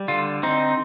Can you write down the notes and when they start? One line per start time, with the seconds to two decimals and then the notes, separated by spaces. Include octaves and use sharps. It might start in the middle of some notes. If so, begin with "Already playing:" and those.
Already playing: G3
0.08 D3 F4
0.43 C4 D#4